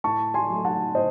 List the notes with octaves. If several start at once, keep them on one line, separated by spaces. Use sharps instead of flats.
A2 A5 C#6
G#5 C6
F#3 A3
F#5 A5
A2 C5 D#5